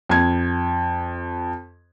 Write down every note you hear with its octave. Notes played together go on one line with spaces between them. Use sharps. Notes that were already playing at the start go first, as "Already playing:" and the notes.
F2 G#6